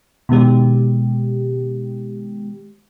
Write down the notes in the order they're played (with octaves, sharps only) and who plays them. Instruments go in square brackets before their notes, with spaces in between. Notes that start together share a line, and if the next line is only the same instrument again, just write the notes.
[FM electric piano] B2 D#3 G#3 G4